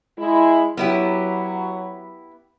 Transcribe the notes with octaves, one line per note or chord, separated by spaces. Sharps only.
G#3 E4
F#3 B3 E4 G4